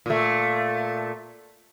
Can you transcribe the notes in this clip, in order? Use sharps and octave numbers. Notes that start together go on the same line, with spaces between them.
A#2 A3